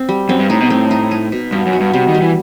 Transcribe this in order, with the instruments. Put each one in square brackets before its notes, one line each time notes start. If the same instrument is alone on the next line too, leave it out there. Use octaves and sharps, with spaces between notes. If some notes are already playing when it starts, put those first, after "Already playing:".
Already playing: [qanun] C4
G3
[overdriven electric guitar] F#2 [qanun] C4
[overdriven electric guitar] G2
[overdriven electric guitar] A2 [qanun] D#4
[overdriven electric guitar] B2
[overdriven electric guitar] A2 [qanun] C4
[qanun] D#4
D#4
B2
[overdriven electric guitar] G2 [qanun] B3
[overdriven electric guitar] F#2
[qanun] F#4
[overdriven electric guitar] G2
[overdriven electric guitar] C3 [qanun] G3
[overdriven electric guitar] D#3
[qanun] G3
[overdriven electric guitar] E3